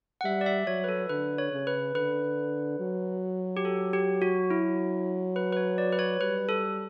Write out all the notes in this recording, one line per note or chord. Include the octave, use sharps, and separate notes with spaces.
F#5
G3 E5
D5
E5
F#3 C#5
B4
A4
D3 B4
C#5
C#3
B4
D3 B4
F#3
G4
A4
G4
F#4
E4
B4
B4
C#5
D5
B4
C#5
G3 B4
A4